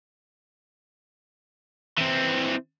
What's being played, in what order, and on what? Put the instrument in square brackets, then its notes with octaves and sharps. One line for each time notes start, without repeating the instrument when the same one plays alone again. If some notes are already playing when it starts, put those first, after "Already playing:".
[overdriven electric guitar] E3 C4